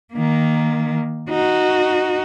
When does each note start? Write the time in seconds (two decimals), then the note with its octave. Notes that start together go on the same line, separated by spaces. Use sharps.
0.13 D#3 A#3
1.30 D#4 F#4